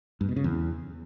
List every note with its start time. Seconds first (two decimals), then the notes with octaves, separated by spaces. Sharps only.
0.21 G2
0.29 B2
0.36 C#3
0.44 E2